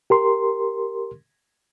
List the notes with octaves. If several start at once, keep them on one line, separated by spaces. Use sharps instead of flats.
G4 A#4 C6